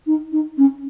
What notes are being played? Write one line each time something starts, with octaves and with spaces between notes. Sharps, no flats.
D#4
D#4
C#4